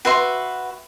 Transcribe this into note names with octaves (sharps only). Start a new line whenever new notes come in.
F#4 B4 E5 C6